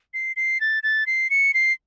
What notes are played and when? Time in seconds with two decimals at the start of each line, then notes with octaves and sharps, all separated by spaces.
0.14 C7
0.36 C7
0.60 A6
0.83 A6
1.06 C7
1.30 C#7
1.54 C7